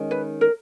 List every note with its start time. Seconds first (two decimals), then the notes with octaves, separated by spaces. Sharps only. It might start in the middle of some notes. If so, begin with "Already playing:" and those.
Already playing: D#3 G#3 C#4
0.11 B4
0.41 A#4